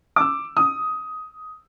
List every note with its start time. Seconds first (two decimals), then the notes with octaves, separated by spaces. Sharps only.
0.16 D6 E6
0.57 D#6